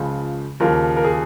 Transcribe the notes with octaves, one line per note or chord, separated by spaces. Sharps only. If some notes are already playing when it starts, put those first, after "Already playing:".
Already playing: C#2 C#3 F3
D#2 C#3 F3 A#4
A#4
G#4